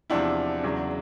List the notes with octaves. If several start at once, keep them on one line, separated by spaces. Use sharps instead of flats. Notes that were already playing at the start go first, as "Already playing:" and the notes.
E2 C3 F3 D4 E4
E2 C#3 F#3